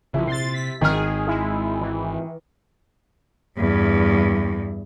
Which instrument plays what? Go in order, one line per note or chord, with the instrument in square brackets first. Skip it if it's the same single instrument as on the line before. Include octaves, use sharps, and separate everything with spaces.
[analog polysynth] A#1 [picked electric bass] C#3 F3 [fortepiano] E4
[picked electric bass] C3 [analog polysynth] C6 A6
[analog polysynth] B6
[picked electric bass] G#1 [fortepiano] D#3 F6 [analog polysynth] G#4
[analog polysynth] G#3 E4
E3
[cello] E2 G2